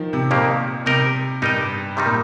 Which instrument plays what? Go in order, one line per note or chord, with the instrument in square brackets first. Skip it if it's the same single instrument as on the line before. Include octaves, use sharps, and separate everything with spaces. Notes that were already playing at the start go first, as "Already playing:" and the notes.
Already playing: [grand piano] D#3 F3
C3
[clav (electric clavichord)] F2 D#3 A#3 G4 [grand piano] A#2
[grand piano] C3 [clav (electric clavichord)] G3 D#4 A#4 D#5
[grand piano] G2 [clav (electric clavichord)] G3 D#4 A#4 D#5
[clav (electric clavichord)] C3 D#3 G3 D#4
[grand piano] A#2